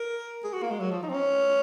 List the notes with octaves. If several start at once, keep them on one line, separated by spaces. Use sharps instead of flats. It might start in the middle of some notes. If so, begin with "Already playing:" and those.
Already playing: A#4
G#4
F#4
A#3
G#3
F#3
F3
D#4
C4
C#4